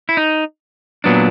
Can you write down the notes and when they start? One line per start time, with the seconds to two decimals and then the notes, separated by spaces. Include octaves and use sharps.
0.09 E4
0.17 D#4
1.04 A#2 F#3 B3 D4